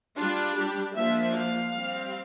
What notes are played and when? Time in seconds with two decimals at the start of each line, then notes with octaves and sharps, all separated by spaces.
0.18 G3 D4 F4
0.57 G4
0.94 F3 A#3 D4 E5
1.34 F5
1.72 G3 C4